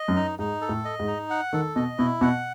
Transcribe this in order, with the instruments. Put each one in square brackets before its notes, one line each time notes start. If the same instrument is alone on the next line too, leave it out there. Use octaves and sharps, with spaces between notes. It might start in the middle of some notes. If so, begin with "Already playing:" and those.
Already playing: [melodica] D#5
[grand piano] F#2
[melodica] D#4
[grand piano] G#2 [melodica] D#4
[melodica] A4
[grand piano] A2
[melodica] D#5
[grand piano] G#2
[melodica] D#4
F#5
[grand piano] D#3 [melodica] A4
[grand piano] B2 [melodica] D#5
[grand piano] B2 [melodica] E4
[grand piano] B2 [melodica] F#5